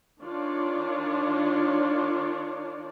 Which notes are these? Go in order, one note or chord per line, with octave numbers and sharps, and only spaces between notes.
D#3 D4 F4 C#5 D5